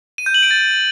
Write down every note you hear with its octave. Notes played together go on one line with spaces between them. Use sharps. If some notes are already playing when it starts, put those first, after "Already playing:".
D#7
G6
F#7
D7
A6